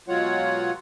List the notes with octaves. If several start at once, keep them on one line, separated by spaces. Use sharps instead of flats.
B2 F#3 G#3 F4 C#5 F#5